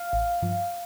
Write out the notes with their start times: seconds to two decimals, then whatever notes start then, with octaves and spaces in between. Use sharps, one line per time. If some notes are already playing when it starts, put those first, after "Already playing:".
Already playing: F5
0.13 A1
0.42 G2 F3